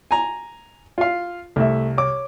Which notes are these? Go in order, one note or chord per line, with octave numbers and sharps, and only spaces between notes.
G#5 A#5
F4 F5
C2 A3 E5
C#5 D6